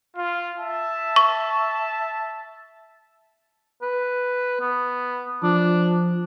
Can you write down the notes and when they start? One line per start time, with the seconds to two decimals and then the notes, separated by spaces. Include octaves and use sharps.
0.16 F4
0.58 E5 A5
1.16 C#6
3.82 B4
4.61 B3
5.43 F3 D4